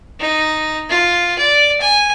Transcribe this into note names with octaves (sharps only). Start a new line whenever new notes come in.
D#4
F4
D5
G#5